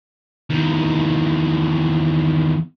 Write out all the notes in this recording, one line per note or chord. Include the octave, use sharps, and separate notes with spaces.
E2 D#3